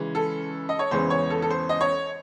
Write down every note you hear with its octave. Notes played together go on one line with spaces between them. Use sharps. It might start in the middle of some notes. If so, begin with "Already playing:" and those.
Already playing: C#3 E3 G#3 C#4
A4
D#5
C#5
E2 C#3 E3 G#3 C#4 C5
C#5
A4
A4
C5
D#5
C#5